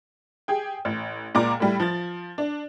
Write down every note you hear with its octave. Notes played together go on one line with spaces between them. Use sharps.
G4 G#4 G5
A1
C#2 A#2 D5 A#5 D6
A2 G3
F3 A6
D4